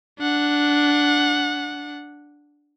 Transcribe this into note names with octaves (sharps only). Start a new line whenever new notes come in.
D4 F#5